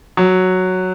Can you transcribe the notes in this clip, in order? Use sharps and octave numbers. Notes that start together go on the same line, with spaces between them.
F#3